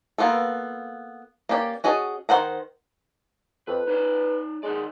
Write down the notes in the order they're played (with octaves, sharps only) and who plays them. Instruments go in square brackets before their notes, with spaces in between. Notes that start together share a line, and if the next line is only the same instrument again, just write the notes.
[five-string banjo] A#3 B3 F4 A4
A#3 C#4 G4 D5
C#4 F#4 G#4 D#5 A5
D#3 A#3 C5 F#5 A#5
[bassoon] F2 [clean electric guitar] B4
[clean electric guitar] D#4 C#5 D5 [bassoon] B4
[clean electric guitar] D#3 D#4 D5 [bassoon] G#3